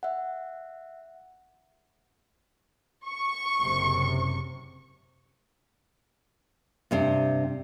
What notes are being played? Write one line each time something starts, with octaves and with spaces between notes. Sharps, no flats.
E5 F#5
C#6
F#1 C3
G2 C3 C4